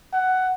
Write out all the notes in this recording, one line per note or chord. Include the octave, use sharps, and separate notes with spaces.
F#5